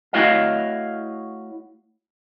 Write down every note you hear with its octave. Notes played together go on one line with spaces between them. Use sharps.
A3 E4 F#4 C#5 D#5 F5